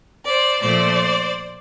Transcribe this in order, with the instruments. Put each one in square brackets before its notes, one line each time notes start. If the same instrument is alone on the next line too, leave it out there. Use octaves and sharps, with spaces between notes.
[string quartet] C5 D5
A#2 F3 A3 C5 D5